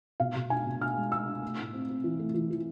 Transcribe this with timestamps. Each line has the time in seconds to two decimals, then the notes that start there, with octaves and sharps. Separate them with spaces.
0.20 B2 F5
0.36 B2
0.50 D4 G#5
0.66 B2
0.81 D4 F6
0.97 G#3
1.12 G#3 E6
1.28 D4
1.42 A3
1.58 A2
1.73 C4
1.89 C4
2.04 E3
2.19 A3
2.34 E3
2.51 E3